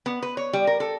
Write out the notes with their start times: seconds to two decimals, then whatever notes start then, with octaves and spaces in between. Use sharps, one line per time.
0.06 B3
0.23 B4
0.37 C#5
0.53 G3
0.67 A#4
0.80 A4